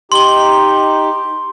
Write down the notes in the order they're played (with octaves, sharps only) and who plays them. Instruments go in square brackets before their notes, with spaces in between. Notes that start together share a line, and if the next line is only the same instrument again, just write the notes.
[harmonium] D#4 G4 [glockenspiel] C6 G7